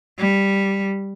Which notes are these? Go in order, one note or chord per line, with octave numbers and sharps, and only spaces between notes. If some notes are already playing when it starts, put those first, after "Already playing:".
G3